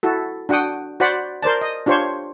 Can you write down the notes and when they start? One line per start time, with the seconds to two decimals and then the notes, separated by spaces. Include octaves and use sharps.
0.03 E4 F#4 A4
0.49 D4 F#4 F#5 G5 D#6
1.00 F#4 C5 D5 F#5 B5
1.43 A#4 C5 D5 A5
1.61 D#5
1.86 D4 F4 G4 C5 C#5 C#6